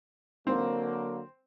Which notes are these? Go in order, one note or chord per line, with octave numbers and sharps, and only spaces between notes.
D3 F#3 A#3 C4